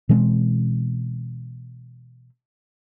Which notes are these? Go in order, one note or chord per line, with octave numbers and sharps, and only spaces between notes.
B2 E3 G#3 C4